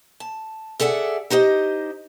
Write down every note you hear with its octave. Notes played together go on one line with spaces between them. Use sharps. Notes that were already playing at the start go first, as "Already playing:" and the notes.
A5
G#4 A4 D5 E5 F#5
D#4 G4 C5 D#5